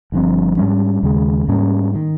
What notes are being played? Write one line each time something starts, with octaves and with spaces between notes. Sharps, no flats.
G1 G2 F3 C4
G#2 G3 C#4
D#2 C#3 G#3
G#2 G3 A#3 C#4
D#3